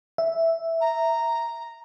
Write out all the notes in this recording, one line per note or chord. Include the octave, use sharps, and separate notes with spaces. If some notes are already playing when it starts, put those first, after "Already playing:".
E5
A#5